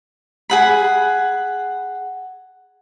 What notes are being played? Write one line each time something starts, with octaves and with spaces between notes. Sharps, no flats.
G#4 F#5 B5